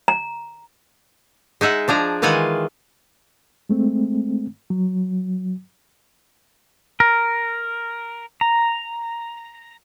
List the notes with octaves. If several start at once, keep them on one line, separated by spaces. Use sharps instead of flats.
A#5
G#3 D#4 E5 F#5
F3 D4 G#4 A#5
D#3 E3 G#3 F4 F#5 G#5
G#3 A3 C4
F#3
A#4
A#5